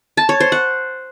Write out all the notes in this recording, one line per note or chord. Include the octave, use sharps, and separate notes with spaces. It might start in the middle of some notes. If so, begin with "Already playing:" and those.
A5
C#5
C5
F#5